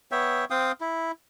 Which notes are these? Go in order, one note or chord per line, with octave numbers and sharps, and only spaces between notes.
B3 C#5 E5 G5
C4 F5 G5 D#6
E4